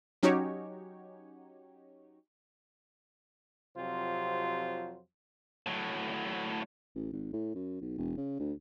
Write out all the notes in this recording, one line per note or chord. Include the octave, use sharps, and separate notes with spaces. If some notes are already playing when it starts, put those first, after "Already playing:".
F#3 C#4 D#4 F#4 G4 C#5
F2 C3 F#3 F4 G4 C5
A2 F#3
A1
G#1
A2
F#2
B1
E1
C#3
D2